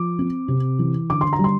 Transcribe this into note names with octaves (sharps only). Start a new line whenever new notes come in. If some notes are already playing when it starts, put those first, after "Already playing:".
Already playing: F3 D6
C4
C3
E3
D3 D6
C6
A#5
G3
C6